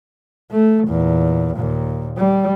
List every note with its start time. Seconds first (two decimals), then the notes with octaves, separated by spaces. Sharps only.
0.52 A3
0.88 E2 A#2
1.54 D#2 A#2
2.17 G3